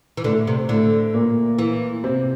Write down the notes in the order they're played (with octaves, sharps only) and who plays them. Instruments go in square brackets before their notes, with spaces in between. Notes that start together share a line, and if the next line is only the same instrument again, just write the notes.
[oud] E3
[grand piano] A2 A3 [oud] D3
[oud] C3
[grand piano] A2 A3 [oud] D3
[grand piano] A#2 A#3
[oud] E3
[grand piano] C3 C4